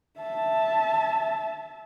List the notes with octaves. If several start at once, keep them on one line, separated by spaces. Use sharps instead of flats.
E5 A5